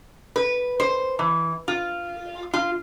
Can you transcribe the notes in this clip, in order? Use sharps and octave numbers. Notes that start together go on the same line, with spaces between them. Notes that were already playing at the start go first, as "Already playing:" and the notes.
B4
C5
E3
F4
F4